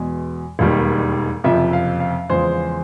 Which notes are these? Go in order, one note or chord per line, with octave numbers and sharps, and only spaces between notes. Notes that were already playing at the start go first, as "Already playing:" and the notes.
Already playing: E2 B2 G#3
E1 D#2 D#3 G3
F#1 F2 C3 F3 E5
F5
F5
E2 C#3 F3 G#3 C5